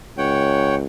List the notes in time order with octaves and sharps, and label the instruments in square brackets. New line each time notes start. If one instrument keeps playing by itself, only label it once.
[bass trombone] C#2 [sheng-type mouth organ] C#5 F#5 G5